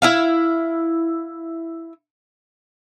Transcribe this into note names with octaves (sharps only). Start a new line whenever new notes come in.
E4 E5 F5